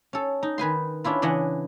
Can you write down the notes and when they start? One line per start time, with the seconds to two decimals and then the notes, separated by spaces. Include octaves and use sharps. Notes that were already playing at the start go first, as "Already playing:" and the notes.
0.13 C#4 A4
0.43 D#4
0.58 D#3 B4 G#5 C6
1.04 C#4 D4 E4 F4
1.22 C#3 E3 D4 D#5 F#5